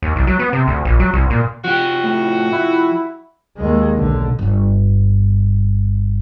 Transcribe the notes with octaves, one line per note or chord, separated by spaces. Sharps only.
D#2
C2
F#3
B3
C3
D2
A#1
F#3
C2
A#2
F3 F#4 G4
A2
E4
D#2 G#3
B1 D3
G1 G2